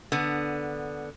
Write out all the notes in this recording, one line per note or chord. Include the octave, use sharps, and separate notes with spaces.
D3 B3